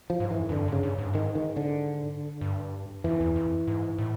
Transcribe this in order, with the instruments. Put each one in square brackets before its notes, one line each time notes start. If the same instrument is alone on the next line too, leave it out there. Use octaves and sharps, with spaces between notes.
[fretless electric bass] F3
[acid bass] G#2
[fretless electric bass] E3
[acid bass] F2
[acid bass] F#2 [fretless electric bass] D3
[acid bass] G2
[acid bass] G#2 [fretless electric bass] C#3
[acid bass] G2
G#2
G2
[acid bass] G#2 [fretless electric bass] D#3
[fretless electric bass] D#3
D3
[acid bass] G2
[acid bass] F2 [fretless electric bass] E3
[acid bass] E2
F2
G#2
A2